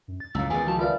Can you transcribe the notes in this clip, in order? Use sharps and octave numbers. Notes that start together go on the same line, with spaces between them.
F#2
A6
C#2 F#2 A2 F5 A#5 E6
C#2 D#3 B3 G#4 G#5
F3 F4 F#4 A5
G3 F4 A#4 B4 D5 E5 F5